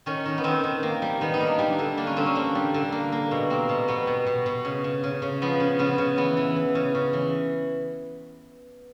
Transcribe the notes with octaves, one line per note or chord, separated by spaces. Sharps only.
D#3 C#4
D#3
B3
D#3 C4
D#3
A#3
G3
D#3 B3
D#4
A#3
D4
G3 D4
D3
A#3 D4
C#4
D3 C4
C#4
A#3 D4
G3
D3
A#3
A#3
B2
A#3 C4
B2
B2 B3
B2
B2
B2
C#3
C#3
C#3
C#3
F3 B3
C#3
C#3 B3
C#3
E3 B3
E3
E3
C#3
C#3
E3